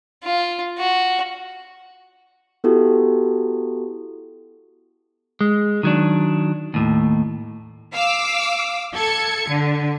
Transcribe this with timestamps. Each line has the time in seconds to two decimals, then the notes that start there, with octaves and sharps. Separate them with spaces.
0.24 F4
0.79 F#4
2.64 B3 E4 F#4 G4 A4
5.41 G#3
5.83 D#3 F#3 D4
6.74 D#2 A2
7.93 F5 D6 E6
8.93 A4 G#6 C#7
9.49 D3